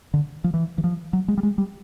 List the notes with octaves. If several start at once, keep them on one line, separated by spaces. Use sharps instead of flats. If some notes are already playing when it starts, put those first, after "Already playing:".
D3
F3
E3
E3
F3
F#3
G#3
G3
G#3
G3